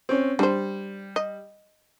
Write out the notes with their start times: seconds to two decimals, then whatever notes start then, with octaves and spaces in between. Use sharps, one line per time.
0.09 C4 C#4
0.39 G3 D4 C5
1.16 D#5